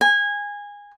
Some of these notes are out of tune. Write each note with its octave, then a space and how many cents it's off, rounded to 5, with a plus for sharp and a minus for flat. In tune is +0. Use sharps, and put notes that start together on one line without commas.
G#5 -20